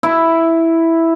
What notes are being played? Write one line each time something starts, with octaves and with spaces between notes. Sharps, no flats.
E4